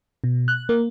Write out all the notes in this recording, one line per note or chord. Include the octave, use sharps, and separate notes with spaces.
B2
F#6
A#3